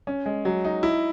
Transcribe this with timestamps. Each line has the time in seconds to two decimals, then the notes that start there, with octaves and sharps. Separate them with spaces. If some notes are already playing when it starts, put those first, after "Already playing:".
0.07 C#4
0.26 G#3
0.45 F#3
0.65 D#4
0.83 E4